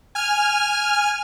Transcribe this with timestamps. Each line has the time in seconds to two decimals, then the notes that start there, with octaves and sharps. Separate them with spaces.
0.15 G#5 F6